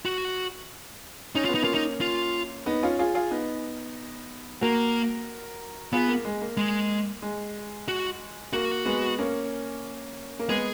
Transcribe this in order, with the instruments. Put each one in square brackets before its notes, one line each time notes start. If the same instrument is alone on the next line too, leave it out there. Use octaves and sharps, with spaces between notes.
[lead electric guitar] F#4
[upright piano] C#4 [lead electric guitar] D#4
[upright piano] B3 [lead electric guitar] F4
[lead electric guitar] D#4
[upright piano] A#3 C#4 [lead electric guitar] F4
[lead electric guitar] D#4
F4
[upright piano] B3 D#4
C#4 F4
F4 G#4
F4 G#4
B3 D#4
[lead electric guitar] A#3 [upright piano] F#4 A#4
[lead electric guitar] B3 [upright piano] F4 G#4
[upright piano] A#3
G#3
A#3
[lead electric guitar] G#3
[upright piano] G#3
[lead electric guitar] F#4
[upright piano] A#3 [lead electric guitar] F#4
[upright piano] G#3 B3
A#3 C#4
A#3
[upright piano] G#3 B3 [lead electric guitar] G#4